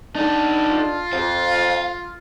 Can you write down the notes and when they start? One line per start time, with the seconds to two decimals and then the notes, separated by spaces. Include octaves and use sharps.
0.16 D4 D#4 A4 D#5 A5
0.69 F4
1.13 F2 F5